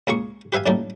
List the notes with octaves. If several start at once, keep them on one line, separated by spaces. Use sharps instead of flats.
C#2 A#3 G#4 C#6
G4 B4 E5 F5 G#5
F#2 A2 G3 A#3 D#4 A5